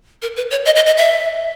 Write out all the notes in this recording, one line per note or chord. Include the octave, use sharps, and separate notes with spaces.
A#4
B4
C#5
D#5
D#5
D#5
E5